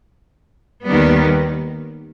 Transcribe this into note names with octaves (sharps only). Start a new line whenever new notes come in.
D#2 D#3 G3 B3